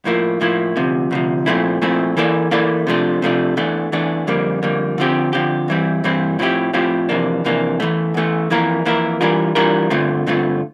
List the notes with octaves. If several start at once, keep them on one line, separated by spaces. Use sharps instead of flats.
A2 F3 A#3 E4
A2 F3 A#3 E4
D2 C3 F3
D2 C3 F3
A#2 F3 A3 C4 E4
A#2 F3 A3 C4 E4
E3 A#3 E4 A4 D5
E3 A#3 E4 A4 D5
C3 F3 A3 D4
C3 F3 A3 D4
E2 E3 A3 D4
E2 E3 A3 D4
F2 D3 G3 A#3
F2 D3 G3 A#3
D3 F3 C4 G4
D3 F3 C4 G4
G2 E3 G3 C4 E4
G2 E3 G3 C4 E4
A2 F3 C4 E4 G4
A2 F3 C4 E4 G4
F2 C3 E3 A#3 D4
F2 C3 E3 A#3 D4
E2 E3 A3
E2 E3 A3
F2 E3 A#3 E4 A#4
F2 E3 A#3 E4 A#4
E3 G3 D4 F4 A#4
E3 G3 D4 F4 A#4
G2 D3 A3 C4 F4
G2 D3 A3 C4 F4